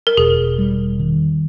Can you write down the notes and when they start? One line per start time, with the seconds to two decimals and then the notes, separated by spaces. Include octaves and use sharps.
0.07 A#4
0.17 E1 G#4
0.59 G3
0.99 D#3